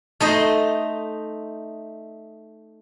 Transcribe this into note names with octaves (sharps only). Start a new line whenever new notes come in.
A3 D#4 C5 D#5